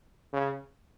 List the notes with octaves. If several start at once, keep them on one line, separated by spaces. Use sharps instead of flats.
C#3